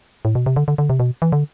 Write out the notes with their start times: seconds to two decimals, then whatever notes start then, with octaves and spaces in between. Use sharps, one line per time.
0.25 A2
0.35 B2
0.46 C3
0.56 D3
0.68 D3
0.78 D3
0.90 C3
1.00 B2
1.22 E3
1.32 D3